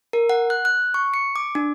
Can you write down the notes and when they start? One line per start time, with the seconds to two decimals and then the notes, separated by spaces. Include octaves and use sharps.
0.13 A#4
0.29 F#5
0.50 F#6
0.65 F#6
0.94 C#6
1.14 C#7
1.36 D6
1.55 D4